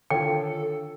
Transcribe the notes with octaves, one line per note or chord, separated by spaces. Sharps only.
D3 D#3 F4 A4 C#5 G5